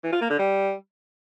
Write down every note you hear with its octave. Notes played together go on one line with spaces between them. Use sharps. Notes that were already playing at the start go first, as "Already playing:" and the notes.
E3
F4
A#3
D3
G3